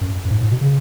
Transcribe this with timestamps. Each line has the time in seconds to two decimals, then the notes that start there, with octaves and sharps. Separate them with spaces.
0.01 F#2
0.25 F#2
0.31 G#2
0.41 A2
0.51 B2
0.61 C#3